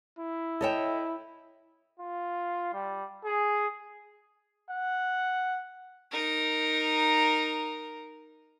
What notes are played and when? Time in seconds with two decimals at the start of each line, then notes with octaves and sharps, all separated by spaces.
0.19 E4
0.61 A4 C#5 D#5 E5 G5
2.00 F4
2.73 G3
3.25 G#4
4.70 F#5
6.11 D#4 A#4